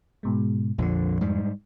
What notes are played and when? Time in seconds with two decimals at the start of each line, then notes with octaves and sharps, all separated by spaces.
0.23 G#2 B2 G#3
0.78 A#1 F2 D3 F3
1.21 G#2 G3